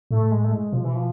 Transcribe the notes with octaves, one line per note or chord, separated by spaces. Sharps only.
A2 A3
G#3
A3
G#3
B2 F3
E3
F3